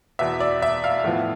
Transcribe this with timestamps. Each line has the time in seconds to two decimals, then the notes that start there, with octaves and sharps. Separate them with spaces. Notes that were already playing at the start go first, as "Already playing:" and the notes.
0.19 E2 B2 B3 E5
0.40 D5
0.62 E5
0.84 F5
1.04 A2 F3 B3